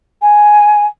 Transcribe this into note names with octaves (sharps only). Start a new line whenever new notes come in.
G#5